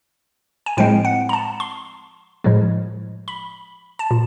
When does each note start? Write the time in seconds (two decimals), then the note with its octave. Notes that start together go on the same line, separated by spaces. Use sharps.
0.66 G#5
0.77 A2 F3 G#3 C4 G5
1.05 F#5
1.29 A#5
1.33 A5
1.60 C6
2.44 A2 F3 G#3
3.28 B5
3.99 A5
4.11 A#2